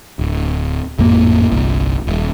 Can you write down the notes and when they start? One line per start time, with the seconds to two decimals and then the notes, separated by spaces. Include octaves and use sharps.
0.19 D1
0.98 G#1 F2 A2 A#3
1.52 G1 C2
2.07 D#1